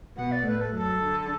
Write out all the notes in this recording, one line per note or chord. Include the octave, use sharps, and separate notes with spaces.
B2 B3 F#5
D5
A2 A3 B4
A4
F#2 F#3 A4
D3